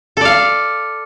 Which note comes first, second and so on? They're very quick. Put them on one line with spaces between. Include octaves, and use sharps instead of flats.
A4 D5 F5